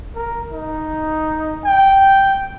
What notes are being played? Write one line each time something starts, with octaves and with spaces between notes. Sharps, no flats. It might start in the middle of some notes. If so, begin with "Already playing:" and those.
A#4
D#4
G5